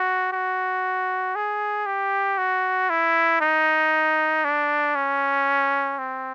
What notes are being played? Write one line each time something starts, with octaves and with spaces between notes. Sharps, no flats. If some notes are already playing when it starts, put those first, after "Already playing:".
Already playing: F#4
F#4
G#4
G4
F#4
E4
D#4
D4
C#4
C4